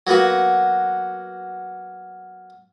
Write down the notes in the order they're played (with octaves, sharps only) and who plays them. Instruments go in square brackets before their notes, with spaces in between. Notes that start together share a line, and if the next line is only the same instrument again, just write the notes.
[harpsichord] F#3 A#3 B3 F#4